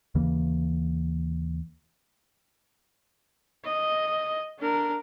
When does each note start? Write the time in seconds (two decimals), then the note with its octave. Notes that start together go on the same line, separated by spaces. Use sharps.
0.15 D#2 C#3 E3 A#3
3.65 D#5
4.59 D4 A#4